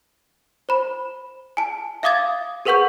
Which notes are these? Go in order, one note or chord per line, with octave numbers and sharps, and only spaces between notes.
C5 B5
G#5 A5
E5 F5 D6 D#6 G#6 A6
G#4 A#4 B4 F#5 C#6 G6